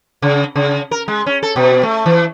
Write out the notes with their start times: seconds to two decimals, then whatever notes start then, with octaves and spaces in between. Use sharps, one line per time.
0.22 C#3
0.55 C#3
0.91 A#4
1.08 G#3
1.26 C#4
1.43 A4
1.56 B2
1.83 A3
2.06 E3